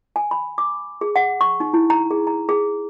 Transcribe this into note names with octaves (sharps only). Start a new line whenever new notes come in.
G#5
B5
D6
G#4
F#5
C#6
D#4
E4
A#5
G#4
A#5
G#4